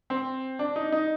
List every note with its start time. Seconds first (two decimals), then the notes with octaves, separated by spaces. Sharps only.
0.10 C4
0.59 D4
0.76 D#4
0.92 D#4